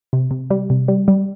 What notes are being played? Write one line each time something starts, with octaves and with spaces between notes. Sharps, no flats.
C3
C3
G3
C3
G3
G3